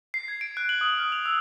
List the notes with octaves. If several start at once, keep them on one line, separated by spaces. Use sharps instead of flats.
C7
G#6
D7
F#6
F#7
D#6
F6
F7
E6